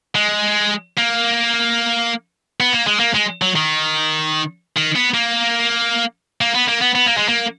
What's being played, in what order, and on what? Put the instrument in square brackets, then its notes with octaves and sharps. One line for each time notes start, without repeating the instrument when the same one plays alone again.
[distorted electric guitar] G#3
A#3
B3
A#3
G#3
A#3
G#3
F#3
D#3
D#3
B3
A#3
A#3
B3
A#3
B3
B3
A#3
G#3
A#3